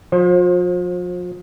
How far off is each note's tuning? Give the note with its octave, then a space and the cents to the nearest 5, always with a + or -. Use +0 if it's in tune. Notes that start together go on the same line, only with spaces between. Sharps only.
F3 +40 C5 +25